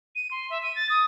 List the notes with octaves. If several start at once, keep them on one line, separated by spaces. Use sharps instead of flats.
D#7
C6
E5
D#7
A6
D#6